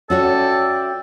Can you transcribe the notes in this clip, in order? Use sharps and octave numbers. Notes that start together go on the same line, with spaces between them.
C#4 F#4 A4 C#5 D5 E5 G5